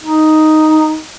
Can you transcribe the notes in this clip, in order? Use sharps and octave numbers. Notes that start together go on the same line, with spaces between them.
D#4